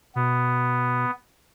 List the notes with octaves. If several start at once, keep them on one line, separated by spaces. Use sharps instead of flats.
B2 B3